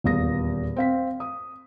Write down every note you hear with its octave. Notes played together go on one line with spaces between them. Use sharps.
D#1 E2 F5 D#6 A#6
C4 F5 B6
D#6